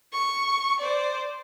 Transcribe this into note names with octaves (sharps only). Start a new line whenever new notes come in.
C#6
C5 D5